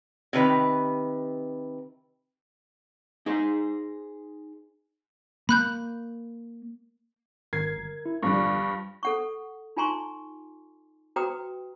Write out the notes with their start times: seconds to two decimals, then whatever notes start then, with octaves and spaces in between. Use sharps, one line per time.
0.33 C3 D#3 B4 A#5
3.26 D#4 G#4 C5
5.49 A#3 B5 F#6 G6
7.53 G#1 A#4 G#6 C7
7.78 G1
8.06 E4
8.23 E2 G2 D3 F3 G3 F5 C#6
9.03 A4 F#5 C#6
9.77 D#4 F4 G#5 A#5 C6 C#6
11.16 F#4 B4 G5 A#5 D#6